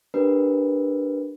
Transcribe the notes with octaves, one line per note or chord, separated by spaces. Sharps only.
D4 G4 A#4 B4